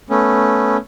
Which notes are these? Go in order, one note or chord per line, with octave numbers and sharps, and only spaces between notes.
A3 B3 C#4